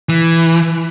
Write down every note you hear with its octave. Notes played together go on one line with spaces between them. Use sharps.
E3